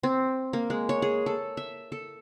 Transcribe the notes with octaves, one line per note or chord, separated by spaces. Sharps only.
C4
A#3
G#3
C#5
G#4
A4
E5
A4